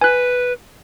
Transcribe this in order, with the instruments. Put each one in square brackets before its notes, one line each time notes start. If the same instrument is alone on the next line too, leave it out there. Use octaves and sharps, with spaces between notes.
[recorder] B4 [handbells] G#5 F#6